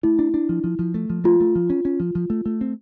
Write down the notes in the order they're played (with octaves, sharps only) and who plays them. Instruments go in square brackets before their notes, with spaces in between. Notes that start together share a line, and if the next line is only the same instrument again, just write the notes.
[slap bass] A3 [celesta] E4
[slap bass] D4
D4
F3
F3
F3
A3
F3
[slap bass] A3 [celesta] F4
[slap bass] A3
F3
C#4
C#4
F3
F3
A3
A3
C4